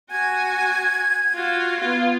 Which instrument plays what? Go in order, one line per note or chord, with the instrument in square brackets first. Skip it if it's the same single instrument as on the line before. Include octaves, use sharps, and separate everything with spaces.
[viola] F#4 G#5 [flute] G#6
[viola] F4 F#4
B3 F4